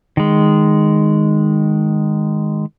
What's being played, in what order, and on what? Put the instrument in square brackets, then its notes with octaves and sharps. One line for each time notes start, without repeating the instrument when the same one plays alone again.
[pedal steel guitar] D#3 G#3